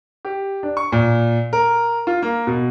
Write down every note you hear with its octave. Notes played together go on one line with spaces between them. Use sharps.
G4
D4
C#6
A#2
A#4
F4
A#3
B2